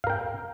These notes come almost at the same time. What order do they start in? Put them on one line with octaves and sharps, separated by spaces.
F5 A#4 G5